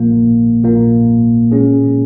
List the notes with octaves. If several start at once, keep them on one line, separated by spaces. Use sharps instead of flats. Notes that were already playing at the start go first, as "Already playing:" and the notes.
Already playing: A#1 A#2 A#3
A#1 A#2 A#3
A#2 G#3 C#4 G#4